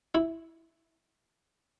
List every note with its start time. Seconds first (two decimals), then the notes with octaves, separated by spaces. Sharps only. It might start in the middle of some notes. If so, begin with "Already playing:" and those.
0.15 E4